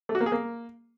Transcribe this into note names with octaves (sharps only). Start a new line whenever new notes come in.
A3
F#4
A#3
G#4
A#3